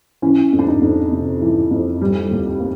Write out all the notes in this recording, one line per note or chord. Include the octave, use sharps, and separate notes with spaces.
E3 C#4
F2
D4
D#4
F2
C3
E3
F2
G3
D#2
A#3